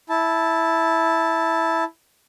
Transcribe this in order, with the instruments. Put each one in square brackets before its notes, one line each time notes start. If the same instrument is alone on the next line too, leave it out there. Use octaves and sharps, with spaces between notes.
[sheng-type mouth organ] E4 A5